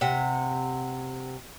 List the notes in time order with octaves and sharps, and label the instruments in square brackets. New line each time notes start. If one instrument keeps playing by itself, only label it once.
[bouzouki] C3 F#5